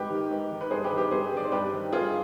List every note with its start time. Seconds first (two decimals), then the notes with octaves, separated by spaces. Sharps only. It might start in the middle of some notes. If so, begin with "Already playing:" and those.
Already playing: G#2 G4 B4
0.10 D#3
0.30 G#2
0.50 D#3
0.61 B4
0.70 G2 G#4 C5
0.84 G4 B4
0.91 D#3
0.97 G4 B4
1.11 G2 G#4 C5
1.32 D#3
1.37 D5
1.44 C5
1.52 G2 G4 B4
1.72 D#3
1.92 G2 F4 G#4